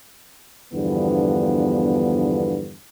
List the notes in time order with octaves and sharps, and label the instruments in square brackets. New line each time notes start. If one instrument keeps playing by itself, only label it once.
[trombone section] E2 G2 D3 F3 B3